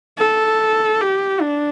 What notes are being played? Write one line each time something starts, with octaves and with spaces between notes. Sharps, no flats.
A4
G4
D4